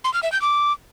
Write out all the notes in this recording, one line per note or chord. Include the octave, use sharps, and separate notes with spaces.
C6
F6
E5
G6
D6